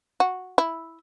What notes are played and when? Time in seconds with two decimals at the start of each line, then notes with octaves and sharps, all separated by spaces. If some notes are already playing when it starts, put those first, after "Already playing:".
0.20 F#4
0.58 E4